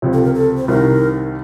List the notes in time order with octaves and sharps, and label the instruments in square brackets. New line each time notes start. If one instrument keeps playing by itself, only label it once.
[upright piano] C#2 C3 F3 C4
[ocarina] A4
A#4
A4
C5
[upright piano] C2 C3 D#3 [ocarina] A#4